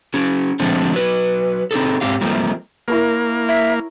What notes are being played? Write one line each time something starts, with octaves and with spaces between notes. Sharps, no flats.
F#3 C#4 G#4
D3 F3 G#3 A3 C4 D4
F#3 B4
C4 D#4 G#4 A4
G#2 C4 G4 F5
F3 G3 A3 A#3 C4
A#3 E4 A#4 C#5
E5